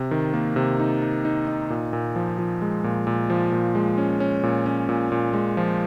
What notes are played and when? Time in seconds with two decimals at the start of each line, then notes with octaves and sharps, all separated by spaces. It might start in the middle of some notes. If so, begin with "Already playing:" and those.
Already playing: C3
0.11 D#3
0.34 A#3
0.56 C3
0.79 D#4
1.02 D#4
1.25 D#4
1.48 D#4
1.70 A#2
1.93 A#2
2.16 F3
2.39 F3
2.62 G#3
2.84 A#2
3.07 A#2
3.30 F3
3.52 A#2
3.75 G#3
3.98 C#4
4.20 C#4
4.43 A#2
4.66 C#4
4.89 A#2
5.12 A#2
5.33 G#3
5.57 F3